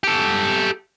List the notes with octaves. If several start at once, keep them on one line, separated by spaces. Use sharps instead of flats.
G4 A4